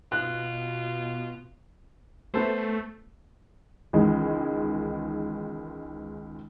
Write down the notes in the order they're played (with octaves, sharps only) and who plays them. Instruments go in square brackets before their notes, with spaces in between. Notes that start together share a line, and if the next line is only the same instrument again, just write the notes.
[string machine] B2 [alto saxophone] F4 [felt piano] F#6
[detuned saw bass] A3 [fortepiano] B3 A4 C5
[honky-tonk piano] C#2 D#3 E3 G#3